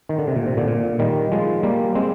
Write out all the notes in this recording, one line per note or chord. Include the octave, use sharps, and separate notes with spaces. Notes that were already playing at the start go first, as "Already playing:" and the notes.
D#3
D3
C3
A#2
C3
A#2 D3
A#2
D#3 G3
F3 G#3
G3 A#3
G#3 C4